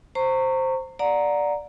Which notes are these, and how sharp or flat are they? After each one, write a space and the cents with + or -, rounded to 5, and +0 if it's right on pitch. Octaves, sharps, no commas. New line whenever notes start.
C5 +0 A#5 -30 C#6 +0
D5 +0 F#5 -25 A#5 +0